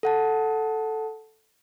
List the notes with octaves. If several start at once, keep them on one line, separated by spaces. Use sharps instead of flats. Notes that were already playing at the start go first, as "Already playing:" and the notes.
A4 F#5 A5